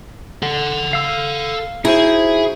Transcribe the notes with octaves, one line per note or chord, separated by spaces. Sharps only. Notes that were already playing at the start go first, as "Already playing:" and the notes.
A4 F#5
F5 E6
D#4 E4 F#4 G#4 C5